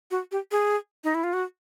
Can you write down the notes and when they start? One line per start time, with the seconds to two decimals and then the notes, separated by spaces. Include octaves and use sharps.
0.11 F#4
0.32 G4
0.51 G#4
1.04 D#4
1.15 E4
1.24 F4
1.33 F#4